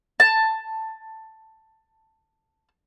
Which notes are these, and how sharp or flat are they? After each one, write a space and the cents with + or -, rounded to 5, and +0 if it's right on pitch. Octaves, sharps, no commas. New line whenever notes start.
A5 +10